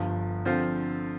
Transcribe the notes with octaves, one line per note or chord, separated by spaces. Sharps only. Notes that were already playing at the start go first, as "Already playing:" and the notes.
Already playing: G1 G2 F3
D3 F3 C4 F4 C5